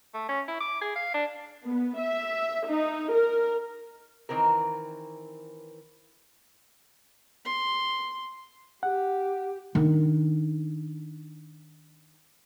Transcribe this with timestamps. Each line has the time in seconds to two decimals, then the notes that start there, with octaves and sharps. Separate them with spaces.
0.14 A3
0.29 C#4
0.48 E4
0.61 D6
0.81 G#4
0.96 F5
1.14 D4
1.65 B3
2.00 E5
2.67 D#4
3.13 A#4
4.29 D#3 E3 C4 A#4
7.46 C6
8.83 G4 F#5
9.75 D#3 D4